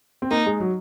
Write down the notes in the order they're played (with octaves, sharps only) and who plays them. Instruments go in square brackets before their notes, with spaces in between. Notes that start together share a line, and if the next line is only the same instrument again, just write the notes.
[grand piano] C4
[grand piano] A#3 [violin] D#4
[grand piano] G#3
F#3